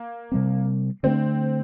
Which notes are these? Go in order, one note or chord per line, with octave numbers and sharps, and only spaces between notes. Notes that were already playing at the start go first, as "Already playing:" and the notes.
Already playing: A#3
C3 G3 C4
D3 A3 C4 D4